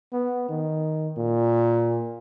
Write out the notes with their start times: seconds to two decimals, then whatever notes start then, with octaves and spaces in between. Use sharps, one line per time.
0.12 B3
0.49 D#3
1.17 A#2